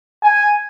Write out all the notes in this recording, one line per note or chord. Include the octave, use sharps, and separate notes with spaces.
G#5